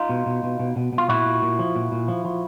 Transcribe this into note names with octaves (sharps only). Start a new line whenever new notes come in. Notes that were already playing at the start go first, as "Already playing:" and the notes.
Already playing: D#4 F4
B2
B2
B2
B2
B2
B2
F4
A#2 E4 F#4
A#2
A#2
F3
A#2
A#2
F3
F3